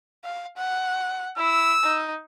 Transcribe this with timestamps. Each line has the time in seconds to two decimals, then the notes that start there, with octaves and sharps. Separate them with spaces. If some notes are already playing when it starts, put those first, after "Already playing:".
0.24 F5
0.57 F#5
1.38 E4 E6
1.84 D#4